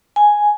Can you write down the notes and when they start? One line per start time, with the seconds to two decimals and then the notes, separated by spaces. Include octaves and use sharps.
0.16 G#5